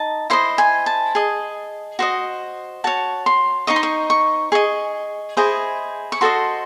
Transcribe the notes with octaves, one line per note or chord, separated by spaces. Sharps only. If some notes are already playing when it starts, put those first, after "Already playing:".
Already playing: D#4 D#5 A5
E4 C5 D#5 C6
G#5
A5
G#4 D#5
F#4 C5 D#5
F#4 C#5 A5
C6
D#4 F#4 C5 D#5 C#6
C6
C#6
C#6
G#4 D#5 C#6
E4 G#4 C5 D#5
C#6
F#4 A4 C5 D#5 C6